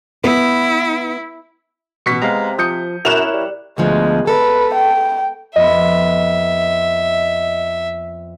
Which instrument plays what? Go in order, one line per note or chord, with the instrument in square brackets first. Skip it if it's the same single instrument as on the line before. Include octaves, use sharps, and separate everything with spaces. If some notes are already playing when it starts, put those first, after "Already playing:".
[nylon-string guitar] B3 B4 [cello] E4
[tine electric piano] A1 C#7 [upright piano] B2 C#6 B6
[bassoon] C3 [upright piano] G#3 B3 [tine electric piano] F5 A#5
[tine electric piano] F3 [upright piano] D#6 G6 C#7
[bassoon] F#2 [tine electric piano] E4 A#4 C#5 [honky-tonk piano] F#6 E7 F7
[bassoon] G3
[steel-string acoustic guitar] D2 B2 F3 [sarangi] G#3
[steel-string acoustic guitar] A4 [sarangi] B4
[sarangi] G5
[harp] F2 B3 [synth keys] D#5 [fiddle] E5